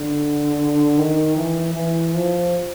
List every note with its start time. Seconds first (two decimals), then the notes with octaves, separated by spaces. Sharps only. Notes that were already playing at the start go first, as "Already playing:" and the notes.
Already playing: D3
0.98 D#3
1.37 E3
1.75 E3
2.15 F3